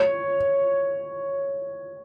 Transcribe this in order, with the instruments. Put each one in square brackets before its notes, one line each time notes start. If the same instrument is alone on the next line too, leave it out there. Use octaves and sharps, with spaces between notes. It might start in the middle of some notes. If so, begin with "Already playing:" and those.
Already playing: [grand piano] C#5